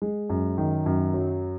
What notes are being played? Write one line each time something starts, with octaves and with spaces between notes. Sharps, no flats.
G#3
F#2
D#3
F#2
F#3